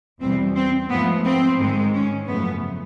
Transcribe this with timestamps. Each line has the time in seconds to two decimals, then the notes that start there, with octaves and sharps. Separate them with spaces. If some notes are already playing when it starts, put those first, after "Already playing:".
0.21 E2 B2 G3 C4
0.56 C4
0.90 G#2 F3 A3 B3
1.25 C4
1.58 G#2 D#3 G#3
1.93 C#4
2.27 F#2 C#3 F3 A3 B3